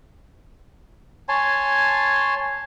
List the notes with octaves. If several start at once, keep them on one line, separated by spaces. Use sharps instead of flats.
C#5 G#5 A5 C6